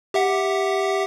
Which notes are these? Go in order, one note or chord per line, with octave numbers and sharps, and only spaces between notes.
G4 E5 F#5